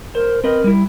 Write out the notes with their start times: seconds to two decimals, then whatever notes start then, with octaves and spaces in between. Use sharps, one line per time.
0.15 A#4 C5
0.44 C4 A#4 B4 D#5
0.64 G3 E4